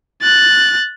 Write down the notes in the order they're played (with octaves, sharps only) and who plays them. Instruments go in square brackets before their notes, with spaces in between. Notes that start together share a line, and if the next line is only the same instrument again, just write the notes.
[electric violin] F#6 A6